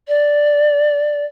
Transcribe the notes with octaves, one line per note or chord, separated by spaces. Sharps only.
D5